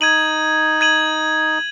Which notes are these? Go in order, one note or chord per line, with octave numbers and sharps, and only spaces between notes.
D#4 G#6 D#7 F#7
G#6 D#7 F#7